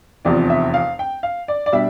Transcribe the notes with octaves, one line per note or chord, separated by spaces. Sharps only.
F1 E2 C3 F3 D5
E5
F5
G5
F5
D5
D5
B2 G3 D4 E5